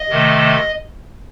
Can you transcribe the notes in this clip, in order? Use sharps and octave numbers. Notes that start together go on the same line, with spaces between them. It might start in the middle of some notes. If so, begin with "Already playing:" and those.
Already playing: D#5
C3 D#3 A3